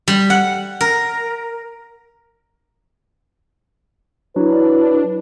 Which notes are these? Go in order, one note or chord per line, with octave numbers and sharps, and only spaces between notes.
G3
F#5
A#4
F#3 D4 E4 B4